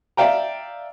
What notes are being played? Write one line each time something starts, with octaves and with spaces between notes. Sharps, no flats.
D5 E5 F5 G5 A#5